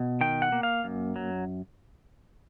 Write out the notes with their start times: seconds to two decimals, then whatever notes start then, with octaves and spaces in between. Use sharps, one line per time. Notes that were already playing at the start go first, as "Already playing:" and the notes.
Already playing: B2
0.21 D#3 G5
0.42 F#5
0.52 A#3
0.63 F5
0.84 F#2
1.16 F#3